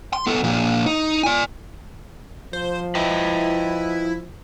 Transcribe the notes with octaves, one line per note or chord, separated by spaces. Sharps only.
C6
B3 A4
A#2 F3
D#4
D5 G#5
F3 C5
E4 B4 D#5 G5